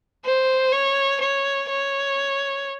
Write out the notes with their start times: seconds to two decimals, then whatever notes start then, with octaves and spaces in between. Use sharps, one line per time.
0.25 C5
0.72 C#5
1.20 C#5
1.69 C#5